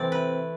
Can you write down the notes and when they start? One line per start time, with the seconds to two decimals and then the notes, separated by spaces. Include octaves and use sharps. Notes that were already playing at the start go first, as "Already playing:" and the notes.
Already playing: C3 E3 A3 C4 D5
0.12 B4